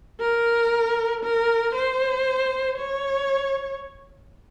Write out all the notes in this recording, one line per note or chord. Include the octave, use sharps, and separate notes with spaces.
A#4
A#4
C5
C#5